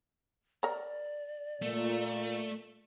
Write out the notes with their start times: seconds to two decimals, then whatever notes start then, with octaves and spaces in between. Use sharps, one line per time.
0.63 A#4 C#5 D5
1.62 A#2 A3